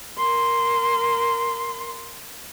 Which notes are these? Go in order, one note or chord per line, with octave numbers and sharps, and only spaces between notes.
A#4 C6